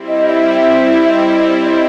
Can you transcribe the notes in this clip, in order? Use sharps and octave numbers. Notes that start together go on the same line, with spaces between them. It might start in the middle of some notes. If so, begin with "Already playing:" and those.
Already playing: G3 C4 E4
D#5
E5
E5
D#5
D#5
D5
D5
D#5